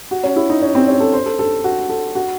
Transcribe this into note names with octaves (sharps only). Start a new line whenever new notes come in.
F#4
C#4
E4
D#4
C#4
C4
C#4
A4
C5
A4
A4
F#4
A4
F#4